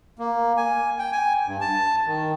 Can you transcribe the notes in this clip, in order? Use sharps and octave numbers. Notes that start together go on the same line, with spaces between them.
A#3
G#5
G5
G#5
G2
A5
D#3